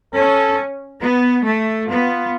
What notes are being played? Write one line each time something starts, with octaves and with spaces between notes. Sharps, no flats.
C#4 A4
B3
A3
B3 F4